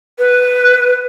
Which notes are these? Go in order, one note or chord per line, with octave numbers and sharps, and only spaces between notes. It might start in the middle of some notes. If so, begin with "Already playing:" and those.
B4